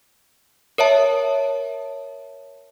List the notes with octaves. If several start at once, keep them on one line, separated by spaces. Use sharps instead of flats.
A#4 C#5 E5 A5